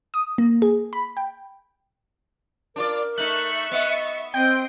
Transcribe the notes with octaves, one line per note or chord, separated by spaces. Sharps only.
D#6
A#3
G#4
B5
G5
D4 F4 A#4 D5
A3 D#4 E5 C#6 F#6
B3 D#5
C4 D#5 G5 C6 D7